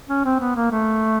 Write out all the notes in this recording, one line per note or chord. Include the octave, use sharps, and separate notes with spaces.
C#4
C4
B3
A#3
A3